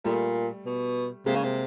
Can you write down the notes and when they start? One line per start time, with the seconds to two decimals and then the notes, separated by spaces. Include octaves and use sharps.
0.04 A#2 G3 A3
0.66 B2
1.26 C3 G#3 A#3
1.35 C#3
1.44 C3